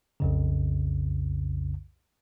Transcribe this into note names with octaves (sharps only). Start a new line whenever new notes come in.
B1 F2 C#3